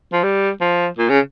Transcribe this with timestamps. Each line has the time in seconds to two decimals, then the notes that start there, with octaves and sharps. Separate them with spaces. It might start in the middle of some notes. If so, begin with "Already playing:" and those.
0.13 F3
0.23 G3
0.61 F3
0.98 A#2
1.09 C#3